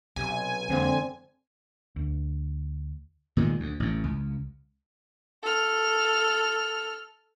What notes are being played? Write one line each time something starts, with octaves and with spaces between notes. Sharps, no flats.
B1 C3 G#5
F2 D3 G#3 A#3 C4
D2
A#2 D#3 G#3
D2
A1 A2
C#2
A4 F6